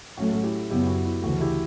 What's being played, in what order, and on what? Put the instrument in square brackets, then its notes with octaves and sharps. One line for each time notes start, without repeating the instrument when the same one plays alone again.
[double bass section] A2 F#3 A3 C#4 [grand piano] F#4
[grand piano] E4 G4
[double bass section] F#2 C#3 F#3 B3 [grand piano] E4 G4
[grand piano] F#4
E4
[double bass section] D2 C#3 E3 A3 [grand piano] F#4
[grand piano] E4 G4